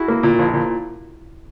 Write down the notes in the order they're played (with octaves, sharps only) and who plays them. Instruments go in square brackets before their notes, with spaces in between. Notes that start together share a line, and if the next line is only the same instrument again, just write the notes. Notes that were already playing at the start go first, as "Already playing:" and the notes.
Already playing: [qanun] E4 F#4 G#4
[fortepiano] A#3
A#2
A#1
A#2